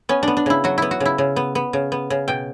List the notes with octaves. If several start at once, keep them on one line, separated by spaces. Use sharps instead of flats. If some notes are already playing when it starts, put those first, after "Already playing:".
B3 C#4
B3 D4
D4
C#3 E4
F#3 F#4
B3 E4
F#4
C#3
E4
C#3
B3
B3
C#3
B3
C#3
B2 G5